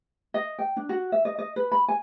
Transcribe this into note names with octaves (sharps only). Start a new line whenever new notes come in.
D#5
G5
D4
F#4
E5
D#5
D#5
B4
B5
G#5